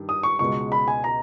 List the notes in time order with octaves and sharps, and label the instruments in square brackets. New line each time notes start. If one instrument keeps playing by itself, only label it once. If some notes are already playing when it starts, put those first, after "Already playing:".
Already playing: [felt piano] G2 D#3 G3
[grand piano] D#6
C#6
[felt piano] C#2 B2 G#3 [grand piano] C#6
[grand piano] B5
G#5
A#5